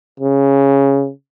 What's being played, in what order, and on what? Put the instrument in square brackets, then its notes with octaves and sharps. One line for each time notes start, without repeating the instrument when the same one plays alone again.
[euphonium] C#3